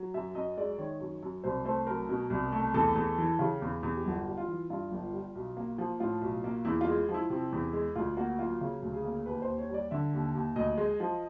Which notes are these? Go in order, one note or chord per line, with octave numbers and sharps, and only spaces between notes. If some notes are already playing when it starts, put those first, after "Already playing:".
Already playing: F#3
F#2 E5
F#2 D#5
G#3 D5
D#3 C#5
F#2
F#2
C2 C5
A3 C5
F#3 A#4
B2
C2
A3
E2 A4
E2
E3
C#3 G4
E2
E2
G4
G1 F#4
G3
F4
E3
G2 F4
G1
G3
B1
A#3
F3
A2 F4
B1
A#3
E2 E4
F4
G#3
F3
E4
C3
E2
G#3
D2 F4
A#3 F#4
F#3 F4
C#3
D2
G#4
A#3
D#2 B4
C5
D#2
C#5
G3 D5
D3 E5
D#2
D#2
D2 D#5
G#3
F3